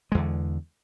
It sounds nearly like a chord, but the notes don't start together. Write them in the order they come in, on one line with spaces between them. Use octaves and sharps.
G#3 E2 D3